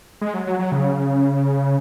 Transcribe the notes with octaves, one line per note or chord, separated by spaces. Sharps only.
G#3
F#3
F#3
F#3
C#3